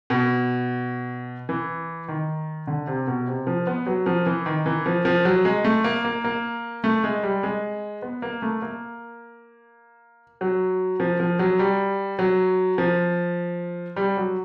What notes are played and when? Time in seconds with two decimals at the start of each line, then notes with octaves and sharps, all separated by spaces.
0.10 B2
1.49 E3
2.08 D#3
2.67 D3
2.87 C3
3.07 B2
3.27 C3
3.47 F3
3.67 B3
3.87 F#3
4.06 F3
4.26 E3
4.46 D#3
4.66 E3
4.86 F3
5.05 F3
5.25 F#3
5.45 G#3
5.64 A3
5.84 A#3
6.05 A#3
6.24 A#3
6.84 A3
7.04 G#3
7.23 G3
7.43 G#3
8.02 B3
8.22 A#3
8.42 A3
8.62 A#3
10.41 F#3
11.00 F3
11.20 F3
11.39 F#3
11.59 G3
12.19 F#3
12.78 F3
13.96 G3
14.17 F#3